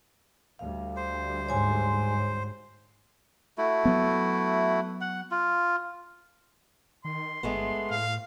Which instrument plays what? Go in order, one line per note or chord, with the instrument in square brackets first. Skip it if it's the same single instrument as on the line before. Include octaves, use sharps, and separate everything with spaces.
[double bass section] D2 G3 [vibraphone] F5
[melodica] C5
[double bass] G#2 [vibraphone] C#5 G#5 C6
[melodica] A3 E4 F#4
[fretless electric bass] F#3 B3
[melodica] F#5
F4
[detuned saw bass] D#3 [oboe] C6
[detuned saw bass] G1 [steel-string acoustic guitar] G#3 A3 B3
[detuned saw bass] A2 [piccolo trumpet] F5